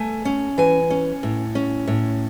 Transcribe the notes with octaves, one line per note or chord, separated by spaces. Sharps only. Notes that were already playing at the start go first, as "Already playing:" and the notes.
Already playing: A3 G#5
C#4
E3 G#5
C#4
A2
C#4
A2